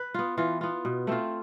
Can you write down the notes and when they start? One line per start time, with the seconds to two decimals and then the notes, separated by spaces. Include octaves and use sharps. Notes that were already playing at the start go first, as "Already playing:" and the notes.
Already playing: B4
0.14 B3 F4
0.38 E3 F4
0.61 B3 F4
0.85 B2
1.07 A3 C4 F4